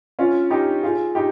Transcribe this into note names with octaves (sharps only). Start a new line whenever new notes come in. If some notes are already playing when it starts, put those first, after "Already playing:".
C#4 F4
D#4 G4
F4 G#4
D#4 G4